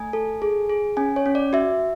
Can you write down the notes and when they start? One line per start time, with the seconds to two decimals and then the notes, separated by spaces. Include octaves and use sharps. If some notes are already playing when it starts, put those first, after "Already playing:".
Already playing: A3 G#5
0.13 A4
0.42 G#4
0.70 G#4
0.97 C#4 G#5
1.16 C#5
1.26 C#4
1.35 D5
1.53 F#4 E5